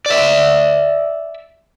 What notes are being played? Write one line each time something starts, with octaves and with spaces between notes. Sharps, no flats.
D5 E5